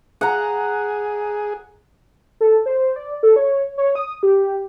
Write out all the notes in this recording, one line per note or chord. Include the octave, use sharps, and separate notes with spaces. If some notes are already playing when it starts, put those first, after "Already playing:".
G#4 F#5 A#5
A4
C5
D5
A4
C#5
C#5
D#6
G4